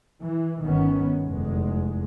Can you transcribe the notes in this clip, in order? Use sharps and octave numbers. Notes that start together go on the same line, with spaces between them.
E3
G1 D#3 B3 C#4
F1 E2 G#3